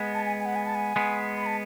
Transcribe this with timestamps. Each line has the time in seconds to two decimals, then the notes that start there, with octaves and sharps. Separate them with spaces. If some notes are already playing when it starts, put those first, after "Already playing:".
Already playing: G#3 B3
0.14 A5
0.25 G#5
0.39 G#5
0.45 F#5
0.55 G#5
0.66 A5
0.75 G#5
0.96 G#3 B3
1.36 B5
1.46 A5